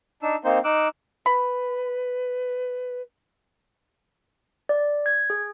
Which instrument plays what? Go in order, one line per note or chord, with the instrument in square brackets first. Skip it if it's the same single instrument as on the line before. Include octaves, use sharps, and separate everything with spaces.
[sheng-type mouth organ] D4 D#4 E6
A#3 C4 D#4 C5
D#4 D6 E6 F#6
[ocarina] B4 [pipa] B5
[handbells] D5
G#6
G#4